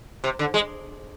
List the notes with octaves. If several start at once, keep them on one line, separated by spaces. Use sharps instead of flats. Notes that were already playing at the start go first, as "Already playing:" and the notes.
C3
D3
G#3